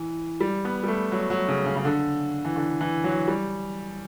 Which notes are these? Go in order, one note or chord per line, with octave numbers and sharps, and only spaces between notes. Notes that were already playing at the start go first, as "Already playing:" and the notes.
Already playing: E3
G3
B3
G3
A3
F#3
F#3
C#3
C#3
C#3
D3
E3
D3
E3
F#3
G3